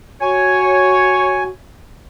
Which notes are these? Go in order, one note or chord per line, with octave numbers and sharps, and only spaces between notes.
F#4 C#5 G#5